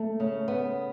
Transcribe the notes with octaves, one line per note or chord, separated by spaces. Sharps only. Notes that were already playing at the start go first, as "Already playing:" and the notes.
Already playing: A3
C#3
B3